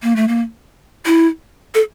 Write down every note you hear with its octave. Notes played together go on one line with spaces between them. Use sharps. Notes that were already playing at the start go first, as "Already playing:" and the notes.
A#3
A3
A#3
E4
A4